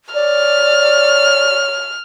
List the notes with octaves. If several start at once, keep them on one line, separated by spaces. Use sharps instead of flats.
C#5 D5 F6